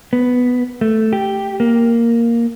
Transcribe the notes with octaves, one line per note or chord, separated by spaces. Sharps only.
B3
A3
G4
A#3